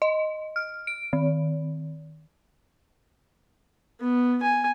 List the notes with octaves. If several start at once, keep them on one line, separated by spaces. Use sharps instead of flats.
D#5
F6
D7
D#3
B3
G#5